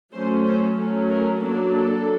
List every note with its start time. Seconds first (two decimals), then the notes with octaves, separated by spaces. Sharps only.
0.12 F#3 A3 C#4 C5
0.45 C5
0.77 F#3 A3 C#4
1.09 A#4
1.41 F#3 A#3 D4 A4
1.74 A4